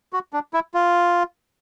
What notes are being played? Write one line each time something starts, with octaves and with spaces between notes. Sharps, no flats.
F#4
D4
E4
F4